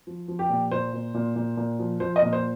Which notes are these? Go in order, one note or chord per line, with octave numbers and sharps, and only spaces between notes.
F3
F3
G4
A#2
A#2 C5
A#2
A#2
A#2
A#2
F3
F3 C5
D#5
A#2
C5